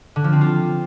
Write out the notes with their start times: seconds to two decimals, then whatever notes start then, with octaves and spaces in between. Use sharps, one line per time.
0.16 D3
0.24 F3
0.33 C4
0.41 F4